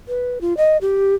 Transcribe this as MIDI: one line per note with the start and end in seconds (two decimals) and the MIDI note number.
0.08 0.38 71
0.41 0.56 65
0.57 0.77 75
0.81 1.15 67